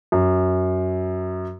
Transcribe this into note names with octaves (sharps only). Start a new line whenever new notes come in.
F#2